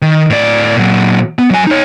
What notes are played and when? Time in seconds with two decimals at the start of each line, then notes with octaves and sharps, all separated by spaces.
0.02 D#3
0.30 A2 D5
0.77 A#2 F#3
1.39 B3
1.50 F#3 G#5
1.67 D#4 C#5